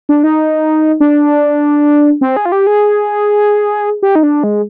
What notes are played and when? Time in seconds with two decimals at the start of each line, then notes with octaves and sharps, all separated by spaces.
0.09 D4
0.24 D#4
1.00 D4
2.21 C4
2.37 G#4
2.45 F4
2.52 G4
2.67 G#4
4.03 G4
4.15 D#4
4.23 D4
4.44 G#3